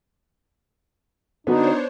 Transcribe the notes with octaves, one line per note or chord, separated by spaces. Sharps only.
D3 B3 D4 D#4 F#4 C5 C#5